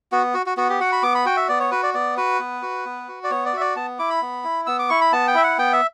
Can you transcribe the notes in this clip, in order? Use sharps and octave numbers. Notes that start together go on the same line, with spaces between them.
B3 F#4
F#4
F#4
B3 F#4
G4
F#4 F#5
B5
B3 D6
B5
F#4 G5
E5
B3 D5
C#5
F#4 B4
D5
B3 D5
F#4 B4
B3
F#4
B3
F#4
D5
B3 C#5
D5
F#4 E5
D5
B3 A5
E4 D6
B5
B3
E4
B3 E6
D6
E4 C#6
B5
B3 A5
G5
E4 E5
F#5
B3 G5
E5